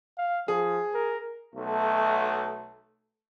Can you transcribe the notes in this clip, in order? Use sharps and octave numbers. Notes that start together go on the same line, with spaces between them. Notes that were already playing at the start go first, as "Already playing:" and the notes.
F5
F3 G#4
A#4
B1 A3